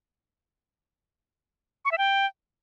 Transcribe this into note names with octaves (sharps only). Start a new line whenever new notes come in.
C#6
E5
G5